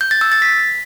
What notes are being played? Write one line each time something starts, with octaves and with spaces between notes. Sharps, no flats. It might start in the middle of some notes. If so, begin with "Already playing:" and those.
G6
A6
E6
A6
B6